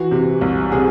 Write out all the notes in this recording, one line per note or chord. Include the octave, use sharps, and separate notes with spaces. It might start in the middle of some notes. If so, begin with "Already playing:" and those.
Already playing: E3 F#4
C3
C2
C3 G#4